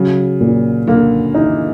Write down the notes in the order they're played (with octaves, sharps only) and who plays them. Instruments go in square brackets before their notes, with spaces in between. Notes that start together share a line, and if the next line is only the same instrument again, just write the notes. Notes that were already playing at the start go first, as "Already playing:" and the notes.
Already playing: [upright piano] C#3 [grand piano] F#3
[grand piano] A#2
[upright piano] D3 [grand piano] A#3
[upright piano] E3 [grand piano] D#4